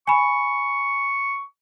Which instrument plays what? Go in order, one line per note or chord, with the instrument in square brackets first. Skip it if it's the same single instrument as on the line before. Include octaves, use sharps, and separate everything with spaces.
[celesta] G#5 B5 [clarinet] C#6